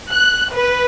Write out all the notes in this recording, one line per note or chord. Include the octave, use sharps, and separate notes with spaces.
F#6
B4